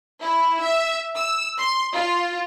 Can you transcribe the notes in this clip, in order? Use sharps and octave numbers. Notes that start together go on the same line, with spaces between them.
E4
E5
E6
C6
F4